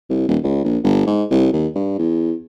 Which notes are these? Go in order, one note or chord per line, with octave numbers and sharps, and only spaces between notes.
C2
D#1
C#2
A#1
G1
G#2
C2
D#2
G2
E2